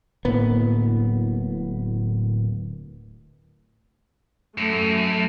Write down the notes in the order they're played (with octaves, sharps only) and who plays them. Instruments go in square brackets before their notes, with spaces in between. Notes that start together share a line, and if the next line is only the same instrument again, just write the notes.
[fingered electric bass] D1 A2 A#3 B3
[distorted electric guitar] F#2 [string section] A3